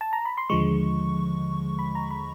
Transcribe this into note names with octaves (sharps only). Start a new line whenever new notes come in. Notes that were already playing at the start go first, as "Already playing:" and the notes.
A5
A#5
B5
C6
D#2 D3 F3 G#3 C#6
B5
A#5
B5